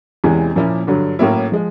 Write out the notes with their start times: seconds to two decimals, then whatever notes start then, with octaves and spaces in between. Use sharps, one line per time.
0.24 E2 C3 E3 G#3 C#4
0.56 A#2 F3 A#3 C#4 E4
0.87 G2 D3 F#3
1.19 A2 F#3 A#3 C#4 E4
1.52 F3 G#3